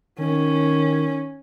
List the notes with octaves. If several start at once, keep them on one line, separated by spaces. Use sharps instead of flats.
D#3 C#4